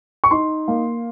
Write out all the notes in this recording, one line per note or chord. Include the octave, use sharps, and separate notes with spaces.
C#6
D#4 C6
A#3